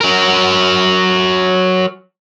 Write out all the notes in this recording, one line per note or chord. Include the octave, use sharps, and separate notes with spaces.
F#3 A#4